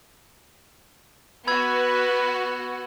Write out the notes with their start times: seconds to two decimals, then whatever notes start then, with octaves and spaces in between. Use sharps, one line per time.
1.47 B3 F#4 B4 B5 E6 G#6